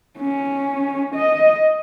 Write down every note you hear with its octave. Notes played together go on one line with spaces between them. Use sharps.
C#4
D#5